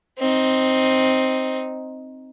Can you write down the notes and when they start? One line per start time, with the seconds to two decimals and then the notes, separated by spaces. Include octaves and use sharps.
0.19 C4 D#4